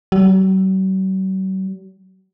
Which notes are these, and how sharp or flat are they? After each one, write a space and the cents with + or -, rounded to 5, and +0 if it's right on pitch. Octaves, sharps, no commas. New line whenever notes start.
F#3 +45